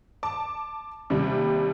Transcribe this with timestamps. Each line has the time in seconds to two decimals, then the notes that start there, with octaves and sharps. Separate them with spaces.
0.23 A5 D6
1.10 D#2 C3 G3